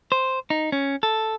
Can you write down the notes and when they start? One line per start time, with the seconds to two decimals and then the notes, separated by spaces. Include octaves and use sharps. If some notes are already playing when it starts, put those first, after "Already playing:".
0.12 C5
0.50 D#4
0.72 C#4
1.03 A4